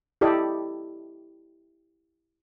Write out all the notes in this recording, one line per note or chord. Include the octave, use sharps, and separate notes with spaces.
E4 G4 A4 D5 D#5